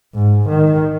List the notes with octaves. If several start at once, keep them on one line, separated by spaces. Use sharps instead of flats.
G#2
D#3